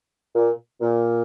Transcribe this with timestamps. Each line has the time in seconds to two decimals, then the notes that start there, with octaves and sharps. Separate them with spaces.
0.36 A#2
0.81 A#2